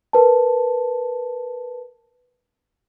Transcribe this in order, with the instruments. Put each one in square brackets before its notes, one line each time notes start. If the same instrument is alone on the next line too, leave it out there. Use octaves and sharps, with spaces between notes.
[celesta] A#4 B4 A5